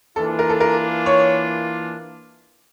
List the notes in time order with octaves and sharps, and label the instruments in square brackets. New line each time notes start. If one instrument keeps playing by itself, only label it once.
[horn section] E3 A#3 D4 F4 [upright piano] A4
[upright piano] A#4
A4
A#4
C#5